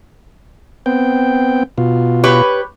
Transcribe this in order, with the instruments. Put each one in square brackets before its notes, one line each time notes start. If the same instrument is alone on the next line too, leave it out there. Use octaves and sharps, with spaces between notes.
[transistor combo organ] B3 C4 G5
B2 F4
[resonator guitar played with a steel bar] G4 B4 C#5